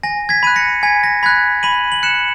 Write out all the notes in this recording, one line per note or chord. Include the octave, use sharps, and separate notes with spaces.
G#5 A#6
G#6 B6
B5 F#6 D#7
A#6 C#7
G#5 G#6 B6
A#6
B5 F#6 G#6 B6
B5 D#7 F#7
F#7
F#6 C#7 E7